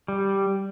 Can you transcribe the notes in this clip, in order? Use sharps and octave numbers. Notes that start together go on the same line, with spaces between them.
G3